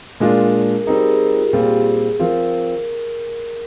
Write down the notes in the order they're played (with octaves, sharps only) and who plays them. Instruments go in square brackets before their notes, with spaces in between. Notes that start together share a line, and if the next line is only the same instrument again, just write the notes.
[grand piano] A#2 G#3 D4 F4 [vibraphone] A#4
[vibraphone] G#4
[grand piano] G3 C4 D#4 [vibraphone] A#4
[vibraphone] G#4
F4
G4
[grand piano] A#2 G3 C4 F4 [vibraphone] G#4
[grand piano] F3 C4 F4 [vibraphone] A#4